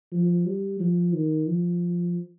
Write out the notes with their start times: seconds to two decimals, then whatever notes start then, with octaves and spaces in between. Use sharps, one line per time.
0.12 F3
0.46 G3
0.80 F3
1.14 D#3
1.48 F3